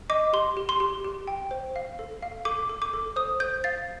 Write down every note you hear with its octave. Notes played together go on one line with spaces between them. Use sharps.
D#5 D6
G4 C6
G4
C6
G4
G4
G5
C5
F5
A4
F5
A4 D6
A4
D6
A4
C5 D#6
C5 G6
F5 A6